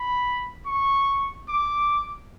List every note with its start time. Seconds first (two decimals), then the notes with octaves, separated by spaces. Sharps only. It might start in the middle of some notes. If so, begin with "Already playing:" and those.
Already playing: B5
0.67 C#6
1.49 D6